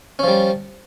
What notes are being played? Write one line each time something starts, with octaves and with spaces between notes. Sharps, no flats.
F3 G3 C#4